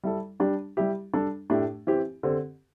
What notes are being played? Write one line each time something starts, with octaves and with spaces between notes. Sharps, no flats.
G3 E4 A4
G3 D4 G4
G3 E4 G4
G3 D4 A4
A2 A3 D4 G4
E3 C4 G4
D3 C4 G4